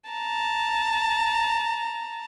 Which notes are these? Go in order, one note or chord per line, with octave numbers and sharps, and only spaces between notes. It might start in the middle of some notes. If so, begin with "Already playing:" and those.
A5 A#5